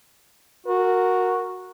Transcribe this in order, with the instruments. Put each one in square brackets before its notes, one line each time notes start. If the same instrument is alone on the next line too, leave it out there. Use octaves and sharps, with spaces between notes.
[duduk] F#4 [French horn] A#4